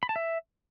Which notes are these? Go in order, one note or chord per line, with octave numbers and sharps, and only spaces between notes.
B5
A5
E5